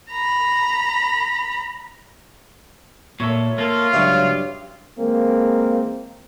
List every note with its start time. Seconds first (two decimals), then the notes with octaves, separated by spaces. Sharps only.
0.11 A#5 B5
3.20 A#2 A4 C#5 E5
3.58 A#3 F4 A4
3.93 C#2 G2 F#3 C#5 E5 F5
4.97 E3 G#3 A#3 C4